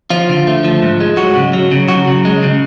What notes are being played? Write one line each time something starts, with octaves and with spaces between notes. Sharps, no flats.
F3 F4
D3
A3
F3
G#2
G#3
F#3 F#4
C#3
F#3
C#3
F#3 F#4
C#3
G#3
C#3